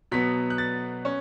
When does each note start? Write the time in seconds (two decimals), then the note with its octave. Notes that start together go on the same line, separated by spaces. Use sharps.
0.12 B2 F#3 B3 B6
0.50 F#6
0.58 A6
1.05 C#4